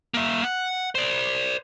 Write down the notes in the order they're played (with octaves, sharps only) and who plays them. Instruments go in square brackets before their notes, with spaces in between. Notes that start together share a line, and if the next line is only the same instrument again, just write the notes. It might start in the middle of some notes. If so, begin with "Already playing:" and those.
[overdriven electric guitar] A#3 E5
F#5
C5 D5